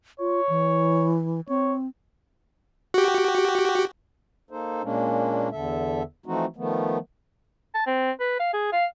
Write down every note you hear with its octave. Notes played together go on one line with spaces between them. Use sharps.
F4 C#5
E3
C4 C#5
F#4 G4
A#3 D#4 A4 C5
A#2 G#3 A#3 C#4 D4
E2 D3 A4 E5
E3 F3 A3 C4 D#4 F#4
D#3 F3 A3 B3
A5
C4
B4
F5
G#4
F5